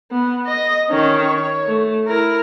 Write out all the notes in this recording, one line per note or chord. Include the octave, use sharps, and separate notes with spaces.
B3
D#5
D#3 C#4
C#5
A3
E4 A#4